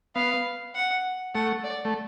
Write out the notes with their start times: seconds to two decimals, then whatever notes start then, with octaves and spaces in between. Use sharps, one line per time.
0.16 B3 F5
0.75 F#5
1.35 A3 F#5
1.64 D5
1.85 A3